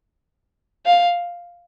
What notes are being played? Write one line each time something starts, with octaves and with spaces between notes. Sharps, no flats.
F5